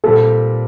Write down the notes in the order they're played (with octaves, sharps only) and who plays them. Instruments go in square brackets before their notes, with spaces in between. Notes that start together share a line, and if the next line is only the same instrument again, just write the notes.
[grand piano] A#2 G3 C4 [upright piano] A4